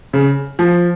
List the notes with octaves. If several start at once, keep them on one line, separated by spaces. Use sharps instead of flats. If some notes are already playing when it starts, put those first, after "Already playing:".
C#3
F3